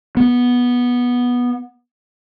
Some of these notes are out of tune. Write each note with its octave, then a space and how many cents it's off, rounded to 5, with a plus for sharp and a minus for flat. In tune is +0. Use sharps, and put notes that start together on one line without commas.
B3 -10